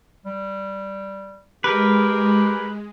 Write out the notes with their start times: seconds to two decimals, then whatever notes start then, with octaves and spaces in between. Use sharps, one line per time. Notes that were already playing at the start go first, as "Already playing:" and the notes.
0.25 G3
1.64 G#3 G4 A#4 B4